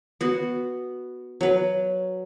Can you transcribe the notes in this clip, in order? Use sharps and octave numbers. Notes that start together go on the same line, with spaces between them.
B3 F#4
F#3 B4